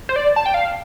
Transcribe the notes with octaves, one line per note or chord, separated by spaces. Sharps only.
C5
D5
A5
G5
F5